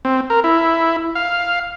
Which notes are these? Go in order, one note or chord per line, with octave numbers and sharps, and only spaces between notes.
C4
A#4
E4
F5